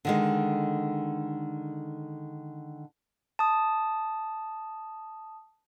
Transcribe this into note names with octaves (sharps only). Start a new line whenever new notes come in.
D3 D#3 G#3
A5 D#6